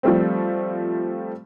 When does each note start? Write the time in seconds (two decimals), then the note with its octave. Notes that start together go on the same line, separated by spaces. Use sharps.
0.03 F3 G3 A3 C4